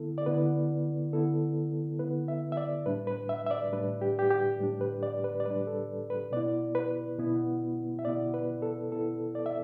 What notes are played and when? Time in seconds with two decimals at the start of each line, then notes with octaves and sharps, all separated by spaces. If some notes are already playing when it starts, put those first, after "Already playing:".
Already playing: D3 B3 E4 A4
0.18 D5
0.26 D3 B3 E4 B4
1.13 D3 B3 E4 A4
1.99 D3 B3 E4 B4
2.28 E5
2.52 E5
2.57 D5
2.86 A2 G3 D4 B4
3.07 B4
3.29 E5
3.46 E5
3.51 D5
3.72 A2 G3 D4 B4
4.01 G4
4.19 G4
4.31 G4
4.59 A2 G3 D4
4.81 B4
5.03 D5
5.24 B4
5.40 D5
5.46 A2 G3 D4 B4
5.67 A4
6.10 B4
6.32 B2 B3 E4 D5
6.75 B4
7.18 B2 B3 E4
7.99 E5
8.05 B2 B3 E4 D5
8.34 B4
8.62 A4
8.92 B2 B3 E4 A4
9.35 D5
9.46 E5